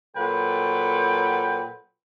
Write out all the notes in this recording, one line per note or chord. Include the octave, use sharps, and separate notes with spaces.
A#2 F#3 A4 B4 F#5 G5